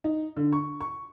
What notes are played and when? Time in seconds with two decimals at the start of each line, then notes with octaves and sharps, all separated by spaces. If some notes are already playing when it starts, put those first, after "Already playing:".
0.04 D#4
0.37 D3
0.52 C#6
0.81 C#6